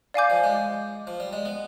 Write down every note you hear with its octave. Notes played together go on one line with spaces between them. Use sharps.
D5 F5 G#5 D6 G6
F3
G#3
F3
G3
G#3
B3